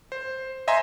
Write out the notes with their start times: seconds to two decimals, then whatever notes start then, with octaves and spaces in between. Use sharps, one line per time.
0.12 C5
0.67 C5 D#5 E5 G#5 A#5 C6